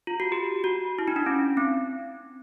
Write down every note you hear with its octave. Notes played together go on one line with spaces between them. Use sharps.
F4
F#4
G4
F#4
E4
D#4
D4
C#4
C4